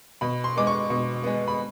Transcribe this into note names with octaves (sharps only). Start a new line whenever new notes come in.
B2 B5
C6
G#3 B3 D6
C#6
B2
G#3 B3
B5